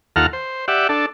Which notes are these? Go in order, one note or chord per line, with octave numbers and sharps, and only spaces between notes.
D#2 F4 A4 F#5 A#5 F6
C5
G4 D5 E5 F#5
D4 A4